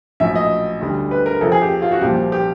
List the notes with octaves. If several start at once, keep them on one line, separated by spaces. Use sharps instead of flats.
A#1 A2 F#3 E5
D#5
D2 D3 G3
B4
A#4
F2 C3 F3 A4
G#4
G4
F4
F#4
C2 A#2 F3 G4
G4